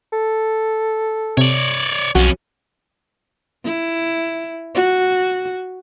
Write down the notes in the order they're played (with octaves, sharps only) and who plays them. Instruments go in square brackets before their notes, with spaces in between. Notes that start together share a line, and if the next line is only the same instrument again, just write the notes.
[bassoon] A4
[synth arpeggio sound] C3 [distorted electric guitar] C#5 D5
[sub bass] B1 [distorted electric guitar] F2 C#4 [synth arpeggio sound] F#4
[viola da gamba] E4
F#4